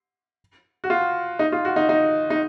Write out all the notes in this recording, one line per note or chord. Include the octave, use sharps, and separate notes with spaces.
F#4
F4
D#4
F4
F#4
D#4
D#4
D#4